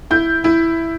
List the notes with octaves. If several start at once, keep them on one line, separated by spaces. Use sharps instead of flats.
E4 G6
E4